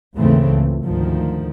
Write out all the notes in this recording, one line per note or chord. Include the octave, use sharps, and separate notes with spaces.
D#2 G#2 C#3 E3 A3 C4
C#2
D2 G#2 D#3 F3